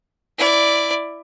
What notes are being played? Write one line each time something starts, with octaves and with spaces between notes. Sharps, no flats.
E4 D5